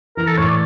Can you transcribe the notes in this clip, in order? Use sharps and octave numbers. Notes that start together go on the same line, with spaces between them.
E3 A#4
A4
A2 C#5
D5